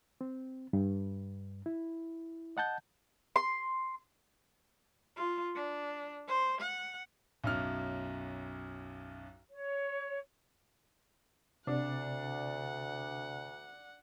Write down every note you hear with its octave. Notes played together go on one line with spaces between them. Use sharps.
C4
G2
E4
D#5 F#5 A5 G6
C6
F4
D4
C5
F#5
B1 F#2 F6
C#5
D2 C3 D4 F#5